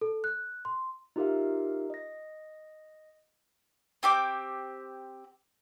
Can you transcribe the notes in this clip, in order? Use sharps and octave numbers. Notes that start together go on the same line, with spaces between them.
A4
F#6
C6
D#4 F4 G4 A#4 E5 F5
D#5 A#6
C4 G4 D6